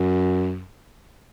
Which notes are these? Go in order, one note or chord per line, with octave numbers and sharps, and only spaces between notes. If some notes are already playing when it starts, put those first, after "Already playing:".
Already playing: F#2